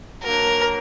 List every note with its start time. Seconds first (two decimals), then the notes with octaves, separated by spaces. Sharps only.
0.23 F#3 A#3 D4 A#4